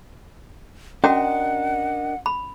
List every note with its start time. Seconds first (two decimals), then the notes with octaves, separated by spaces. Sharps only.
1.04 C#4 D4 F#4 A#4 D#5 F#5 G5
2.26 B5